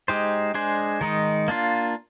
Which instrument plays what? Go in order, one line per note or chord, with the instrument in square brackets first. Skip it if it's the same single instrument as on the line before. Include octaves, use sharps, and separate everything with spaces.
[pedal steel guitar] G#3 D#4 G4 C5
G#3 D4 G#4 C5
D#3 G#3 D#4
A#3 D4 F4